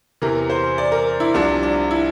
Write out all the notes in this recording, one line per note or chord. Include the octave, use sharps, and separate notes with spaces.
E2 C3 E3 A#4
C5
D5
A#4
E4
C2 C3 F3 D4
D4
E4